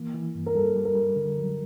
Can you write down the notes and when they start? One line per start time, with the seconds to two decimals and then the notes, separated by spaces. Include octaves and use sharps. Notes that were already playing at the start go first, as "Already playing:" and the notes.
Already playing: E3 A#3
0.14 E3
0.35 G2
0.46 A#4
0.55 G3 A4
0.76 G3
0.85 A#4
0.95 G3
1.16 D3
1.38 F#3